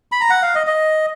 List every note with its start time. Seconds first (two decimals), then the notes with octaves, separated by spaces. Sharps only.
0.12 B5
0.21 A#5
0.30 F#5
0.42 F5
0.55 D#5
0.67 D#5